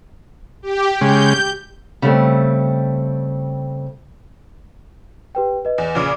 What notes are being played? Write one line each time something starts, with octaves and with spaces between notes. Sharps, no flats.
G4
C#3 G#3 G6
C#3 G3 A3 C4
G4 B4 G5
B4 D#5
E2
A#2 C#3 D6